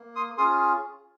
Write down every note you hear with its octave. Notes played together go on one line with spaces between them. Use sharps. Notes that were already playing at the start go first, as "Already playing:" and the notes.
Already playing: A#3
C6 D#6
C#4 F4 G#4 C6 D#6